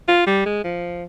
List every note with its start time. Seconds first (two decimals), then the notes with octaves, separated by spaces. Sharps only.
0.08 F4
0.27 G3
0.45 G#3
0.64 F3